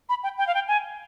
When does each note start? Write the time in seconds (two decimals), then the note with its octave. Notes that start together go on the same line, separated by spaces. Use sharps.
0.09 B5
0.23 G5
0.38 G5
0.47 F5
0.55 G5
0.68 G#5